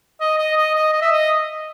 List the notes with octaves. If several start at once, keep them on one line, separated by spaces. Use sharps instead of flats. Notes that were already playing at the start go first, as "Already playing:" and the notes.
D#5
D#5
D#5
D#5
D#5
E5
D#5